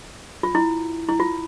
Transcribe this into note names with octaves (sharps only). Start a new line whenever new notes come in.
F4
E4
E4
F4